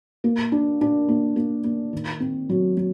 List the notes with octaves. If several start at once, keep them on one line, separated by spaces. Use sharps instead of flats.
A#3
D4
D4
A#3
A#3
A#3
D#3
C4
F#3
F#3